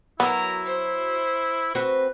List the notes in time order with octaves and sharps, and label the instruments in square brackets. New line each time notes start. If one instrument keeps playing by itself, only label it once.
[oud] F#3 [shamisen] B3 [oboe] E4 [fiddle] A#4 A#5
[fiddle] C5
[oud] C4 F#4 [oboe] B4